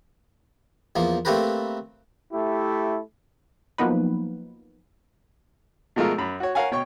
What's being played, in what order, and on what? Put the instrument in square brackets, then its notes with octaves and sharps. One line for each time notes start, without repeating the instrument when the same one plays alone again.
[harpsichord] E2 F3 A#3
A3 A#3 C4 G4 A#4 B4
[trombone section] A3 E4 G4
[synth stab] F3 F#3 A#3 B3 D#4 B4
[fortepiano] B2 F3 G#3 A3 F4 A#4
F#2 B5
F#4 C#5
A#4 C#5 F5 F#5 G#5
B2 C#5 G5 C#6